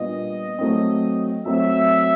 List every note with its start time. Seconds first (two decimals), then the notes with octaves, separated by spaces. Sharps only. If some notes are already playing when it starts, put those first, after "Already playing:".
Already playing: A#2 G3 B3 D4 F4 D#5
0.59 F#3 A3 C4
1.46 F#3 A3 C4 E5